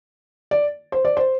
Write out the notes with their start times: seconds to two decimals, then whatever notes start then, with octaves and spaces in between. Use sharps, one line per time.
0.51 D5
0.92 C5
1.05 D5
1.17 C5